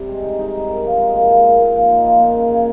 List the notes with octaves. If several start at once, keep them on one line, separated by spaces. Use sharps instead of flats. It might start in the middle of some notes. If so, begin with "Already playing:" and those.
Already playing: C3 G3
G#3
D#4
D#4
D#4
A#4
F3
G#3
A#3
F3
A#2
A#2
F3
D#4
F3
A#2
C#3
C#3